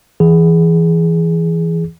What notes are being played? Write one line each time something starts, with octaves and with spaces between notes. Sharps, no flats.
E3 G#4